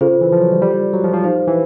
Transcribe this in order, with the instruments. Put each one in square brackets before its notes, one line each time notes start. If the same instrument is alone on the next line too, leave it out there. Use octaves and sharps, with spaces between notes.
[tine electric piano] C#3 [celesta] F4 A4 C5
[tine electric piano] E3
F3
F#3
G3
G3
F#3
F3
F3
[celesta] D#4 G4 C5 F5
[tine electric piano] E3